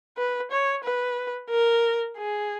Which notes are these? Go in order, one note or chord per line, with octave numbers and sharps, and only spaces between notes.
B4
C#5
B4
A#4
G#4